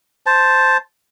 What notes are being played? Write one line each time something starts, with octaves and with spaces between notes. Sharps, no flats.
C5 A5